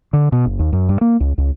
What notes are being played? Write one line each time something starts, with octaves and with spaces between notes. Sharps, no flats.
D3
B2
F#1
D#2
F#2
G2
A#3
C#2
C#2